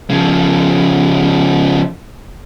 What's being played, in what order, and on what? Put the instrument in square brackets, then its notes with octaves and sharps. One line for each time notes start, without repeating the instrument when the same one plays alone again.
[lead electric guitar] C#3 F3